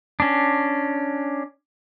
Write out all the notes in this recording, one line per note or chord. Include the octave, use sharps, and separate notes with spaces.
C#4 D4